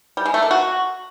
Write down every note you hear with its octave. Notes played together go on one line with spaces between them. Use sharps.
G3
G#3
A3
A#3
F#4